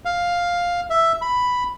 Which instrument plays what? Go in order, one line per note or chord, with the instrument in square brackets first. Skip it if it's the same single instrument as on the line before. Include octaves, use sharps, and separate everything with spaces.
[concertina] F5
E5
B5